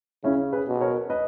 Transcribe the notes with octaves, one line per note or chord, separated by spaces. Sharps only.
C#3 C#4 E4
G#4 B4
B2
A#4 C#5
B4 D#5